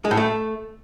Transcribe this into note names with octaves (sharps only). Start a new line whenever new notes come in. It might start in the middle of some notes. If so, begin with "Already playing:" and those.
G#3
A2
A3